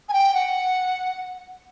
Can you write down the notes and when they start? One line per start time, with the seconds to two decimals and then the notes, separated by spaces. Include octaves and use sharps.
0.09 G#5
0.13 G5
0.34 F#5